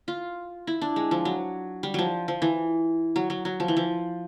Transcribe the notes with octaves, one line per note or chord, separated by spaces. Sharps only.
F4
E4
D4
G#3
F3
F#3
G3
F3 F#3
F3
E3
F#3
F#3
F#3
F3
E3
F3